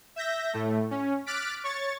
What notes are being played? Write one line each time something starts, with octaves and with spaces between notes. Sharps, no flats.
E5 G6 A#6
A2 A3
C#4
D6 F6 F#6 A6 B6 D7
C#5 C#6 A6